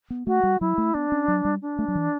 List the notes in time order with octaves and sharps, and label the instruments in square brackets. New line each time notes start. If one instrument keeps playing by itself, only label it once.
[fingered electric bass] B3
[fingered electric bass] A3 [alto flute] F#4
[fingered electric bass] G3
[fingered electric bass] F#3 [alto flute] E4
[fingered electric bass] A3
[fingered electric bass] B3 [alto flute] D4
[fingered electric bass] C#4
F#3
G3
[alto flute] D4
[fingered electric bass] A3
F#3
E3